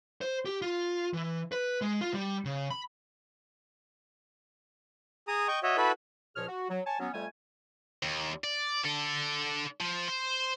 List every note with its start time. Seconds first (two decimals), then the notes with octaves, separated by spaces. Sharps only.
0.21 C5
0.46 G4
0.62 F4
1.13 E3
1.52 B4
1.82 G#3
2.01 F4
2.14 G3
2.45 C#3
2.70 B5
5.28 G#4 A#5 D#6
5.48 D#5 G5 C#6
5.63 F#4 C#5 D#5 E5
5.77 E4 F#4 A4 B4 B5
6.36 C#2 A#2 F3 G#4 C#5 F6
6.48 F#4
6.69 F#3
6.86 C#5 G#5 A5
7.00 F#3 B3 C#4
7.13 F2 G3 A3 G#5
8.03 D#2
8.44 D5
8.85 D3 A4
9.80 F3
10.08 C5